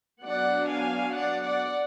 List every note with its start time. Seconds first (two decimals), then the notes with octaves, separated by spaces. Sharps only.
0.22 F#3 B3 D4 D5 F#5
0.68 F5 G#5
1.14 D5 F#5
1.44 D5 F#5